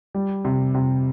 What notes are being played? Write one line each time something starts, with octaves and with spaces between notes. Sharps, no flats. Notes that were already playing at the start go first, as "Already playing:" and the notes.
G3
C3
C3